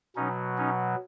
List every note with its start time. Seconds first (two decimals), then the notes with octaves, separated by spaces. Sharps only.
0.16 B2 F#3 C#4 D#4
0.58 C#4 D#4